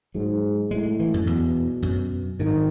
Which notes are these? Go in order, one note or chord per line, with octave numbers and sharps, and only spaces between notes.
G#2 F#3
A2 G#3
E3
F#2
E2 B2
F#2
G#2 D#3